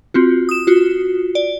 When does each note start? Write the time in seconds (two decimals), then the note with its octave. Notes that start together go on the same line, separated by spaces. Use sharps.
0.14 C4 F4 F#4
0.49 D#6 E7
0.67 F4 F#4
1.35 D5